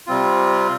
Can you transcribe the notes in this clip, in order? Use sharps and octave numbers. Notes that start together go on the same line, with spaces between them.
C3 G3 C4 F4